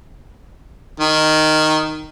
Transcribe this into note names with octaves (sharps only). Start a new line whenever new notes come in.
D#3